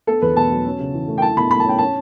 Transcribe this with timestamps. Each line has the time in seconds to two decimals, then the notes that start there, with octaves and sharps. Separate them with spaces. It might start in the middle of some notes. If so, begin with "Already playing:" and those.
0.07 B3 A4
0.22 E2 B4
0.37 B2 A5
0.51 F#3
0.65 C#4
0.79 C#3
0.94 E3
1.08 A3
1.18 G5
1.22 E4 A5
1.37 B2 B5
1.51 A3 B5
1.60 A5
1.65 C#4 G5
1.78 C#4 A5